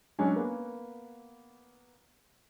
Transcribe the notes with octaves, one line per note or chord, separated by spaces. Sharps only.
F#3 G#3 C#4 D4
A#3 B3